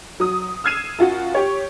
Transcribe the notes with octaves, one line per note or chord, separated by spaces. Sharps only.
F#3 D#6
E6 F6 G#6 C7 D#7 E7
F#2 F4 F#4
G4 C#5